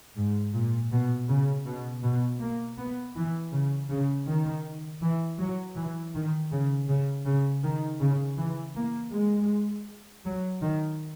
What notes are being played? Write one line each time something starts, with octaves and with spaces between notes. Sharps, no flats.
G#2
A#2
B2
C#3
B2
B2
A#3
B3
E3
C#3
C#3
D#3
E3
F#3
E3
D#3
C#3
C#3
C#3
D#3
C#3
E3
A#3
G#3
F#3
D#3